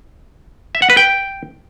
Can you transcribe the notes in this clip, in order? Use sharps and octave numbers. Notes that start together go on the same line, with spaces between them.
E5
F#5
B4
G5